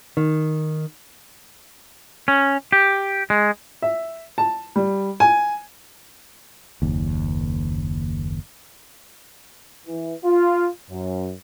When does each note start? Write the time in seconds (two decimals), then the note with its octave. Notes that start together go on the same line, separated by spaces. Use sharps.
0.17 D#3
2.28 C#4
2.73 G4
3.30 G#3
3.82 E5
4.38 A5
4.76 G3
5.20 G#5
6.82 F#1 D#2
9.87 E3
10.25 F4
10.91 F#2